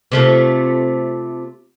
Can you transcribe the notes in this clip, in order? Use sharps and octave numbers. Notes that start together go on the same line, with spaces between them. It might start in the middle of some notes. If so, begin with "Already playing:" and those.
C3 A3 F4